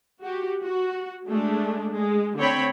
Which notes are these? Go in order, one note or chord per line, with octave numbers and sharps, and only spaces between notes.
F#4 G4
F#4
G#3 A3 D4
G#3
D3 A3 C4 C#5 G5 B5